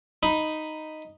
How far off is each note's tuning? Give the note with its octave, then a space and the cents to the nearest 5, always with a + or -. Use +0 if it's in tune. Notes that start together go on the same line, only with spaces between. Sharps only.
D#4 +0 B5 +0